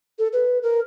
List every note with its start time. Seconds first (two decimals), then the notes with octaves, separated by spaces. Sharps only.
0.19 A4
0.33 B4
0.63 A#4